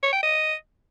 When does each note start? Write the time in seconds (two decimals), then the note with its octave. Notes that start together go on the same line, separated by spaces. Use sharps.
0.03 C#5
0.13 G5
0.23 D#5